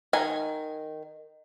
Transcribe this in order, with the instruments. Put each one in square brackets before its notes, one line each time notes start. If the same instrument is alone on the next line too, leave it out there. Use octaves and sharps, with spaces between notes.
[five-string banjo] D#3 G#5